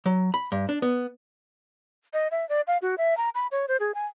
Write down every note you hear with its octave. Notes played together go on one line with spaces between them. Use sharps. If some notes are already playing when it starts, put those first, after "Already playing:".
F#3
B5
G2
D4
B3
D#5
E5
D5
F5
F#4
E5
A#5
B5
C#5
C5
G#4
G#5